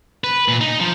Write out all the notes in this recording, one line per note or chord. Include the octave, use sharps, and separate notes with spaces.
B4
A#2
D#4
F3